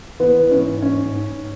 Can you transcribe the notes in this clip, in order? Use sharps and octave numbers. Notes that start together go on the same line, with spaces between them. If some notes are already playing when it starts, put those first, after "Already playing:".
E3 B3
E3
C#4
G#2
G#2 C#4
G#2
G#2